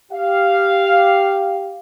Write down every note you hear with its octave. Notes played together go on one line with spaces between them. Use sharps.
G4 F5